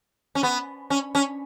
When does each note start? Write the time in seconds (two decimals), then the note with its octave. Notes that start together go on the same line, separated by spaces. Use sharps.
0.35 C#4
0.43 B3
0.90 C#4
1.15 C#4